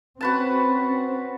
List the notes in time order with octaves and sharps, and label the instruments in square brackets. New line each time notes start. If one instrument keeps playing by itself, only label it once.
[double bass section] C4 C#4 [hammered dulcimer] F#4 B4 A5